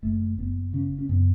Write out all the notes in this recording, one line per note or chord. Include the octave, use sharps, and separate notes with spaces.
F#1 A3
F#1 B3
C#3 C#4
C#4
F#2 B3